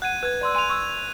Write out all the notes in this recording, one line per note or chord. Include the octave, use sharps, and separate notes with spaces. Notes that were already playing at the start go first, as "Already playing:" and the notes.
F#5 F#6 G#6 D#7
B4 F#6 G#6
D5 C6 E6
G#5 C6 D#7 F7
C#6 E6